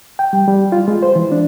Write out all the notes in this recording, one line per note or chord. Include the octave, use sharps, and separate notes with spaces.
G5
G3
G3
F4
G#3
C5
E3
D4